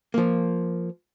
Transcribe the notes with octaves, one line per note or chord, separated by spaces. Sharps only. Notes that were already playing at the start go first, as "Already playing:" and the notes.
F3 A#3